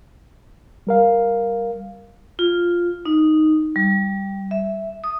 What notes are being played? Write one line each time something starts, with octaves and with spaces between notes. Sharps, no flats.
G3 A#4 F5
F4
D#4
G3
E5
D#6